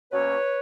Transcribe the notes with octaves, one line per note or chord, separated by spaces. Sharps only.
B2 F#3 A#3 C#4 B4 C#5